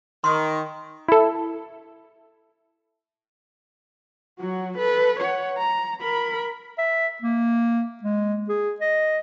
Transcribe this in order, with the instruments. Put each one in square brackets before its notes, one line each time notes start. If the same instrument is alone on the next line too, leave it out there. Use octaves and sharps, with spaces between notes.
[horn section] D#3 [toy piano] C6
[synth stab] E4 A4
[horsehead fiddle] F#3 F#4
A4 B4
C#5 F#5
A#5
A#4 B5
[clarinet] E5
A#3
G#3
G#4
D#5